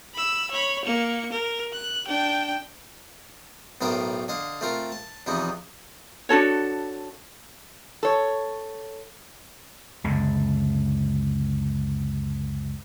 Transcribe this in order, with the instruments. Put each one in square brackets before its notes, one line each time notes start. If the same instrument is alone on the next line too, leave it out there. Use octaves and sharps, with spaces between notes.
[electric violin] B5 E6
C#5 B5
A#3 C#7
A#4
F#6
D4 G5
[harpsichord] B1 A2 B3 A#4 C5 G5
D3 D#5 F5
A3 C4 F4 A#4
A5
E2 C3 E3 F3 B3 D#4
[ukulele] D4 F#4 A4 C#5
[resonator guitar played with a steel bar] A4 C#5
[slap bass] C#2 F#2 D3